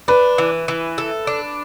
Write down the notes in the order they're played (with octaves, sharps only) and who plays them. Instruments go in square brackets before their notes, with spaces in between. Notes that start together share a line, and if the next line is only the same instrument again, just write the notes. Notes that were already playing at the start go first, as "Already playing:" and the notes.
[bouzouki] D4 [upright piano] B4
[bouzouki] E3
E3
A4
D4